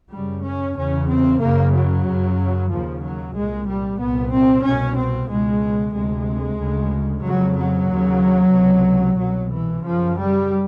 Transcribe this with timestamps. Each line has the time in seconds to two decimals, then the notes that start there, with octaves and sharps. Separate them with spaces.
0.11 F#2 C#3 G3
0.43 C#4
0.75 E2 C#3 C#4
1.09 C4
1.41 F#2 C#3 A#3
1.73 F#3
2.06 F#2 C#3
2.70 D#2 C#3 F3
3.03 F#3
3.35 C2 A#2 G#3
3.68 G3
3.99 C2 A#2 B3
4.32 C4
4.64 C2 B2 C#4
4.96 C4
5.30 C#2 B2 G#3
5.95 D2 C3 G#3
6.59 D2 C#3
7.23 F2 C#3 F#3
7.56 F#3
7.88 D#2 C#3
8.54 C#2 C3
9.17 C2 B2 F#3
9.50 E3
9.83 F#2 C#3 F3
10.15 G3